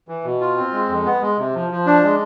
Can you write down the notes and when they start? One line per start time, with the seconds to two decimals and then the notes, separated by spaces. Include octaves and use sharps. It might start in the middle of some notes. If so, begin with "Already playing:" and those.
0.08 E3
0.24 B2
0.41 F4
0.56 C4
0.73 G#3
0.89 F2
1.06 B3
1.21 G#3
1.38 C3
1.54 F3
1.71 F3
1.86 D4
2.03 G#3